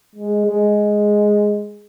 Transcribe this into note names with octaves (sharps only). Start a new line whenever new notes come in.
G#3
G#3